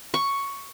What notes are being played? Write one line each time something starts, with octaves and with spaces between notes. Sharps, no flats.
C#6